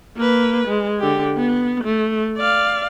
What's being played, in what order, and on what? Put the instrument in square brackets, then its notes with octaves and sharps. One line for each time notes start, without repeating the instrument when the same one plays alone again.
[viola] A#3 B4
G#3
D3 G4
B3
A3
D5 F5